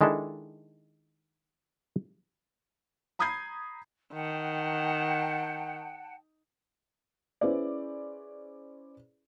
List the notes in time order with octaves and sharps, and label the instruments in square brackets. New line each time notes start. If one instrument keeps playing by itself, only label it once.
[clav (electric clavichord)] D#3 G#3 D4 E4 A4
[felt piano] A#5 B5 D#6 G6 G#6 C7
[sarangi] D#3 [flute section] F#5 G5 A5
[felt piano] C#4 E4 G#4 B4 C5 D5